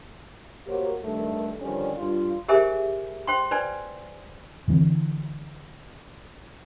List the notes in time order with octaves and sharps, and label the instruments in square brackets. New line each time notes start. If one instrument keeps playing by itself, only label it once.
[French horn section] A#3 F#4 G4 A#4 C5 C#5
G2 D#3 A3
D3 D#3 F3 G3 C#4
G2 F4
[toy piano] G4 G#4 A#4 C5 E5 G#5
C5 G5 C6
B4 C5 D5 G#5
[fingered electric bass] D3 E3 B3 C4